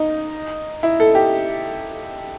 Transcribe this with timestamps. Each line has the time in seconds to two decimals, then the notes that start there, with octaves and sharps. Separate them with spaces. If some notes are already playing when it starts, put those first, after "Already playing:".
Already playing: D#4
0.83 E4
1.00 A4
1.15 G4